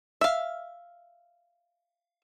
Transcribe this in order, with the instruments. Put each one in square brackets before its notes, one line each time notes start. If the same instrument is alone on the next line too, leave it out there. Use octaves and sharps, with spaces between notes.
[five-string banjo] E5 F5